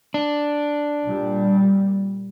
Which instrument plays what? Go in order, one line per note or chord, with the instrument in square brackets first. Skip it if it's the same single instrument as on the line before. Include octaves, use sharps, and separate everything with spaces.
[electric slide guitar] D4
[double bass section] A#2 G3